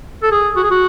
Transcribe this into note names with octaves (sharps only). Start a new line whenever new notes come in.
A4
G#4
F#4
G#4
F#4